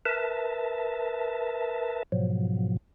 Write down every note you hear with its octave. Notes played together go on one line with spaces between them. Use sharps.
A#4 B4 E5 A5
G#2 B2 F3 F#3